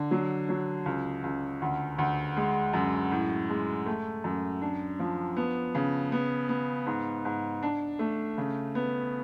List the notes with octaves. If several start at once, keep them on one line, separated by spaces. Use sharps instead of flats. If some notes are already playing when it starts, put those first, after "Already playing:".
Already playing: D3
F#3
F#3
C#2
C#2
D2
D2
G#3
F#2
A2
G#3
A3
F#2
D4
F3
B3
C#3
B3
B3
G#2
G#2
D4
A3
C#3
B3